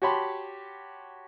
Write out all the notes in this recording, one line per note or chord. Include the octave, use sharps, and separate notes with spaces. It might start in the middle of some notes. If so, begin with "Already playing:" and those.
F#4 G4 C#5 A5 B5 C6